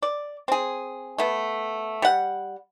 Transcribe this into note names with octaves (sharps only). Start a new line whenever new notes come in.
D5
C4 G#4
A3 B3
G3 F#5